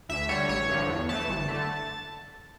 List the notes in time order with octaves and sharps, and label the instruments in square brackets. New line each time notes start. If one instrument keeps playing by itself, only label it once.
[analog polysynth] D2 E5
D3 G3 C#5
A1 C#5
G2 D3 F3
E2
E3 A3 A5
G1
D3 A3